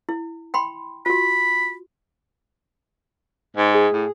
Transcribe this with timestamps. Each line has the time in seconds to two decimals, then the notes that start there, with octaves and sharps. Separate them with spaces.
0.09 E4
0.54 G5 B5 C6
1.06 F4 F#4 B5
3.57 G#2
3.74 G#4
3.92 A2